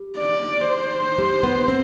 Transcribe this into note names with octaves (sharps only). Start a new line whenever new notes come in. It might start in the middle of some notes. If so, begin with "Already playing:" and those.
Already playing: G3
D5
C5
G3
B3
C4